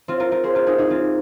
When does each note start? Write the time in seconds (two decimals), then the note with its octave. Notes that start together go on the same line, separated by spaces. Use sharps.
0.08 C4 F4
0.20 F4 A#4
0.32 F4 A#4
0.44 G#4 C5
0.55 F4 A#4
0.67 D#4 G#4
0.78 D#4 G#4
0.90 C4 F4